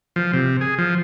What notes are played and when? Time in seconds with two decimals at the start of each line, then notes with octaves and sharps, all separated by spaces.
0.16 F3
0.33 C3
0.61 G#4
0.78 F3